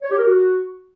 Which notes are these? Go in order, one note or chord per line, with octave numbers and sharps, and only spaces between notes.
C#5
G4
A#4
F#4